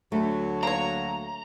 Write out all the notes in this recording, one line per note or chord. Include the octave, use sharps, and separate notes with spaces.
D2 F#3 A3
A#3 C#5 A#5